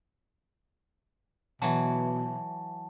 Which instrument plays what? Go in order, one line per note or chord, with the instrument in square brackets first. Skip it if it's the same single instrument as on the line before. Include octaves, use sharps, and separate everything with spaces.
[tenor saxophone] B2 [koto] E3 F#3 [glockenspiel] A5